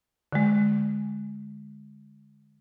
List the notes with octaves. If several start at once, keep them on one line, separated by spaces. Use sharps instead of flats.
D3 G#3